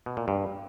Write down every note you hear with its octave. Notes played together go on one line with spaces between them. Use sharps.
B2
A#2
G2